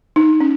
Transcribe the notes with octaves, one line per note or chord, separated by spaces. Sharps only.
D#4
C#4